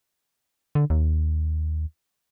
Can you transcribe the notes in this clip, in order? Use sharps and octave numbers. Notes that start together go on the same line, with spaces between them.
D3
D#2